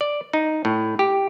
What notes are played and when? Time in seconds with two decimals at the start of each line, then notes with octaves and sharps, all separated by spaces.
0.01 D5
0.33 D#4
0.65 A2
0.99 G4